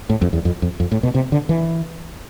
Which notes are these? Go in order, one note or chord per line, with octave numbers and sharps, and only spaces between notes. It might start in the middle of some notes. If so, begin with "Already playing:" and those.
A2
F2
E2
F2
F2
F2
A2
B2
C3
D3
E3